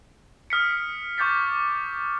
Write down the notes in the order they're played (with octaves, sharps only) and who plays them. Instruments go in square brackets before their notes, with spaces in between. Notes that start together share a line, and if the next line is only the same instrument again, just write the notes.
[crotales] D#6 F6 B6 C#7
C#6 D6 G6 A6 B6